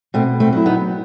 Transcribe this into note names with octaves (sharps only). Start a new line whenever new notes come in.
B2 A3 C4
A3 C4
F#3 E4
B3 D#4